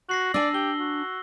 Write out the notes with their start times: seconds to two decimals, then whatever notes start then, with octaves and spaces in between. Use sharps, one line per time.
0.09 F#4 A#6 C7 F#7
0.34 D4 D5 G#5 E6 C7
0.54 G4 G7
0.79 F#4